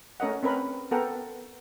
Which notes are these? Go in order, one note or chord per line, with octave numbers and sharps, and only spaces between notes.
A3 C#4 A#4 D#5 F#5
C4 C#4 A#4 B4 B5
B3 A4 A#4 F#5 G5